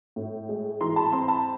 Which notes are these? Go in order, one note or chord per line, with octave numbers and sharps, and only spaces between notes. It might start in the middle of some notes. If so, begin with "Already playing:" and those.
A2
G#3
E3 A#5 C6
A5 B5
C4 A#5 C6
A5 B5